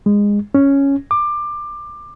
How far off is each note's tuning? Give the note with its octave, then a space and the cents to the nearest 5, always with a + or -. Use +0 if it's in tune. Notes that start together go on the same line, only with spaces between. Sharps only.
G#3 -20
C#4 +0
D6 +20